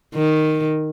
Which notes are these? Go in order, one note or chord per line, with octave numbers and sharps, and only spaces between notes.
D#3